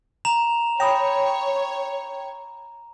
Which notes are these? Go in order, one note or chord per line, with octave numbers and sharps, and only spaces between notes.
A#5 E7 F7
C#5 G5 B5 D#6 A#6